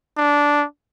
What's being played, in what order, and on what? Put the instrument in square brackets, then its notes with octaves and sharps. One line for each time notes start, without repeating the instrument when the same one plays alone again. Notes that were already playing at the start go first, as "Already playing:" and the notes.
[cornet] D4